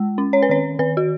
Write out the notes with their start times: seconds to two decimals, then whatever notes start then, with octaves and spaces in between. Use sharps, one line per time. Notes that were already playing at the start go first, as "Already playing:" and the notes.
Already playing: G#3
0.18 C#4
0.33 C#5
0.42 B4
0.49 D#3 C#5
0.79 D#3 B4
0.97 F#4